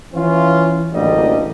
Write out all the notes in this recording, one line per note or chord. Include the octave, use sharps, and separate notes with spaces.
E3 C#4 F4
A1 D2 D3 G3 A#3 D#5